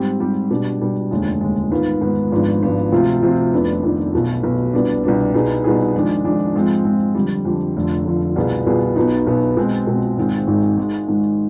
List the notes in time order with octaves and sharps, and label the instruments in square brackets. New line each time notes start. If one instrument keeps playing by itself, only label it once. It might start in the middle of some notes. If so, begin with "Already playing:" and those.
Already playing: [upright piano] G#2 G3 C4 G4
G#2 G3 C4 G4
B2 G3 D4
B2 G3 D4
F1 D#2 D3 G#3
F1 D#2 D3 G#3
G#2 D#3 B3 F4
G#2 D#3 B3 F4
G#1 G#2 F3 B3 D4
G#1 G#2 F3 B3 D4
D2 C3 F3 C4 F4
D2 C3 F3 C4 F4
F1 F2 D#3 B3 D4
F1 F2 D#3 B3 D4
B1 B2 B3
B1 B2 B3
C2 B2 B3 D4
C2 B2 B3 D4
C2 B2 B3 D#4 G#4
C2 B2 B3 D#4 G#4
F2 D#3 G#3 D4
F2 D#3 G#3 D4
G#2 F3 G#3 C4
G#2 F3 G#3 C4
F2 D3 G3
F2 D3 G3
F1 F2 D3 F3
F1 F2 D3 F3
C2 B2 B3 F4 G#4
C2 B2 B3 F4 G#4
B1 B2 B3 D#4
B1 B2 B3 D#4
B2 G#3 C4
B2 G#3 C4
G#1 G#2 D#3 G#3 C4
G#1 G#2 D#3 G#3 C4
G#2 D#3 G#3
G#2 D#3 G#3